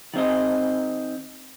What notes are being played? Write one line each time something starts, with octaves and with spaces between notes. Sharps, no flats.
D#3 C4 D#5